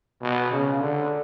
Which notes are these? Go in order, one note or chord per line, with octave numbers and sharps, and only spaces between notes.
B2
C#3
D3